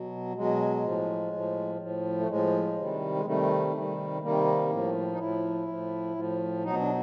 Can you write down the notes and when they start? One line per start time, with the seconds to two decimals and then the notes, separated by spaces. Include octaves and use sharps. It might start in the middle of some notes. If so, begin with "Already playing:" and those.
Already playing: B2 F#3
0.36 B2 F#3 G#3
0.84 A2 F3
1.32 A2 F3
1.80 A2 F3
2.19 A3
2.29 A2 F3 G#3
2.78 C3 D#3 G3
3.15 G#3
3.25 C3 D#3 G3 A3
3.74 C3 D#3 G3
4.22 C3 D#3 G3 A#3
4.70 A2 F3
5.13 D#4
5.18 A2 F3 E4
5.68 A2 F3
6.16 A2 F3
6.63 B2 F#3 D#4
6.80 D4